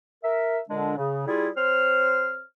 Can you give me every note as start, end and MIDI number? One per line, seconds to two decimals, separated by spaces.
0.24 0.58 70
0.24 0.58 76
0.70 0.97 46
0.70 0.97 50
0.70 0.97 56
0.70 0.97 62
0.97 1.26 49
1.28 1.49 55
1.28 1.49 64
1.28 1.49 65
1.28 1.49 68
1.57 2.44 60
1.57 2.44 72
1.57 2.44 73
1.57 2.44 89